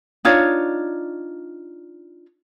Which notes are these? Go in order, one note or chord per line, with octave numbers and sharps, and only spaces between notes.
D4 D#4 F4 C#5